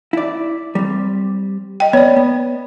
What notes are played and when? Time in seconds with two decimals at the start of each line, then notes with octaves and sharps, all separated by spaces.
0.13 E4 D5
0.75 G3 C4
1.80 D#5 G5
1.93 B3 C#5 D5
2.16 B3